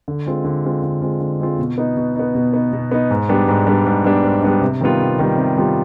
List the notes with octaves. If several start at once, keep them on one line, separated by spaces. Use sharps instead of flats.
D3
G#3 C4 F4
D3
G#3 C4 F4
D3
G#3 C4 F4
D3
G#3 C4 F4
B2
B3 D#4
B2
B3 D#4
B2
B3 D#4
B2
B3 D#4
G#2
G3 B3 D4
G#2
G3 B3 D4
G#2
G3 B3 D4
G#2
G3 B3 D4
C3
D#3 G3 B3 F4
C3
D#3 G3 B3 F4
C3
D#3 G3 B3 F4